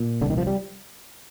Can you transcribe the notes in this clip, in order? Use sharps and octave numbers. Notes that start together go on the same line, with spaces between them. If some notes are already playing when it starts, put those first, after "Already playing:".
Already playing: A#2
C2 D3
D#3
F3
G3